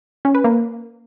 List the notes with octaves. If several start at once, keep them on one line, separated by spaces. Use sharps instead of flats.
C#4
B4
A#3